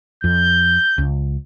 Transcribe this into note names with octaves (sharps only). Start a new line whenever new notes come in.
F2 G6
C#2